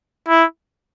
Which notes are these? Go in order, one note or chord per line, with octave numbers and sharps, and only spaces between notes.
E4